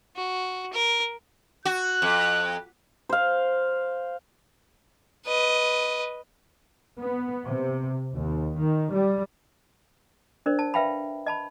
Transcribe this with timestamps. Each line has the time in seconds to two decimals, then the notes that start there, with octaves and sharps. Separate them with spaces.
0.16 F#4
0.73 A#4
1.65 F#4 F#6
2.02 F2
3.09 C5 F5
5.26 B4 D#5
6.99 B3
7.48 C3
8.12 D#2
8.59 D#3
8.94 G3
10.46 D4 A#4 C5 D5
10.59 A5
10.74 B4 E5 F5 G5 A5 B5
11.26 D#5 A5 B5